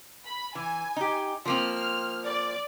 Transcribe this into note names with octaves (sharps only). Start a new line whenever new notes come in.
B5
E3 G#5
D#4 G4
F3 A#3 C4 F6
D5